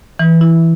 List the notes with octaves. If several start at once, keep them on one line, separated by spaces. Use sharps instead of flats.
E3
E4